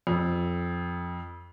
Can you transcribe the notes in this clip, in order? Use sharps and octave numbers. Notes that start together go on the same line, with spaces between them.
F2